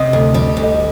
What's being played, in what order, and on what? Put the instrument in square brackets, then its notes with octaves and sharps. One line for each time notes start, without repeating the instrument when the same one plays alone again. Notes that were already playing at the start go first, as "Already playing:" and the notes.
Already playing: [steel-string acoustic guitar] C3 [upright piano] D#5
[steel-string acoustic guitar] D2
[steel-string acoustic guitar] G3 [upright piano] D#5
[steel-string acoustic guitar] D2
[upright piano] D#5